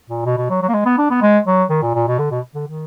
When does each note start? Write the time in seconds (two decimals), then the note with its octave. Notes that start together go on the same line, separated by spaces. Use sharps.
0.10 A#2
0.26 B2
0.37 B2
0.50 F#3
0.62 F#3
0.69 A#3
0.74 G#3
0.86 B3
0.98 D4
1.10 B3
1.22 G#3
1.47 F#3
1.70 D#3
1.82 A#2
1.95 A#2
2.08 B2
2.19 D3
2.31 B2
2.55 D3
2.68 D#3